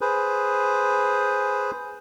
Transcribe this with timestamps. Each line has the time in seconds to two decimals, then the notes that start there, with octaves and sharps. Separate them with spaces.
0.01 G#4 B4 C5